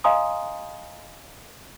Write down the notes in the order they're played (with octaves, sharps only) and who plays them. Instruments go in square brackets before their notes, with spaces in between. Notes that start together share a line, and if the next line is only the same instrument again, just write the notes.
[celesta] D#5 F5 G#5 A#5 C6 D#6